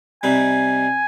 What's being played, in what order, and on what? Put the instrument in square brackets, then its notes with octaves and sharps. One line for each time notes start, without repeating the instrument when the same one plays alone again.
[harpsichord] C3 G3 C4 D#4 B4 [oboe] G#5